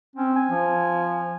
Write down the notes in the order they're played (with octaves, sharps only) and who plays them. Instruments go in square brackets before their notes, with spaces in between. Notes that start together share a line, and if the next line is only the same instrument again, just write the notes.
[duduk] C4 [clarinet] C#4
[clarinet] G#5
[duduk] F3